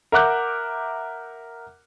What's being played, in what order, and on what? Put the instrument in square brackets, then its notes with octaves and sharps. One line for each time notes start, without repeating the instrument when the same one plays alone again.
[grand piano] A#4 E5 F#5 D6 F#6 G6